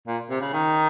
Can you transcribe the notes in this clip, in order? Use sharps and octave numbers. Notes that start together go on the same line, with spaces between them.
A#2
C3
C#3
D#3